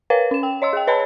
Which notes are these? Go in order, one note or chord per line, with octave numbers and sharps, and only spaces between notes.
A#4 B4 C#5 F5
C#4 E7
G5
C#5 D#5 C6 E6
G#4 G5
B4 C#5 D#5 A5 B5